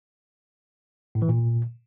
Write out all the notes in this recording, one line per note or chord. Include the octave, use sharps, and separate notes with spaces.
A2
E3
A#2